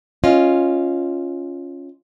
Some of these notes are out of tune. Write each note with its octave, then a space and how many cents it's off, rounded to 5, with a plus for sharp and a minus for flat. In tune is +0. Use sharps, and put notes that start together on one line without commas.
C#4 +0 F4 +0 D#5 +10